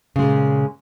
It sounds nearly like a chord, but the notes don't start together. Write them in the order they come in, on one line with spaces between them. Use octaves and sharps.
C#3 G#3 A#2